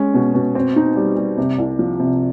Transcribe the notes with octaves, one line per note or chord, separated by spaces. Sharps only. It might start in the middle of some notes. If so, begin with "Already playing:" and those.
Already playing: G#3 C#4
B2
B2
C4
D#4
G3
G3
C3
C2
F3
C3